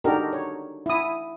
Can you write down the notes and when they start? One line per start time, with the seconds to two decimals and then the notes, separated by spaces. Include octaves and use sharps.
0.04 D4 D#4 F#4 G4 A4 A#4
0.33 C#5
0.86 E4 D#6